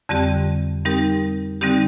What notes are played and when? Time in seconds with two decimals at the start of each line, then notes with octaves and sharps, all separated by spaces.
0.09 F2 D3 G3 C4 G4
0.85 G3 C4 D#4 G4 A#4
1.61 D3 G3 C4 D#4 G4